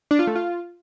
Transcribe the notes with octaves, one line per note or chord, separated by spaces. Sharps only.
D4
F4
A3
F4